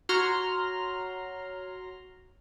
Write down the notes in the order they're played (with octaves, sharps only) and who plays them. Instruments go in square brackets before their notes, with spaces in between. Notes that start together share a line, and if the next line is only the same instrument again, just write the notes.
[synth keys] F#4 C#5 A#5 C6 F6